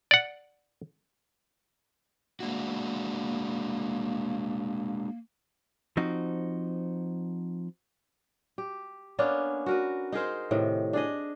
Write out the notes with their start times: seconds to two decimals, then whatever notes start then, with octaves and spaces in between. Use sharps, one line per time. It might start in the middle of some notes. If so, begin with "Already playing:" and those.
0.11 D5 F#5
2.40 G#3 A#3 D4 F#4
5.97 F3 C4 D#4 F#4
8.58 G4
9.19 A#3 B3 C#4 D4
9.66 F#4 A#4 B4
10.12 D#4 G#4 A#4 C5
10.51 A2 C3 D#3
10.93 D4 G#4 D#5